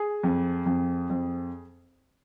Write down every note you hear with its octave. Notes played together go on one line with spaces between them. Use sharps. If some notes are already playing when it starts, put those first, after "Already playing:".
Already playing: G#4
F2
F2
F2